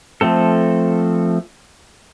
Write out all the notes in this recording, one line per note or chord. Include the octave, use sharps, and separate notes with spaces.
F3 A3 C4 A4